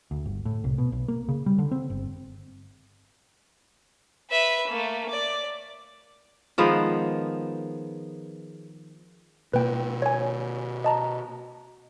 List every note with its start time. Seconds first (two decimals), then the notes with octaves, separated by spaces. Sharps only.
0.11 D2
0.26 G1
0.45 A2
0.64 C2
0.78 B2
0.92 B1
1.08 A#3
1.29 C#3
1.46 G3
1.59 D3
1.71 C4
1.90 G1
4.31 B4 E5
4.68 A3 A#3
5.09 D5
6.58 D#3 F3 G#3 B3
9.54 B2 A#3 B4 G5
10.02 C#5 G#5
10.84 D#5 A5 A#5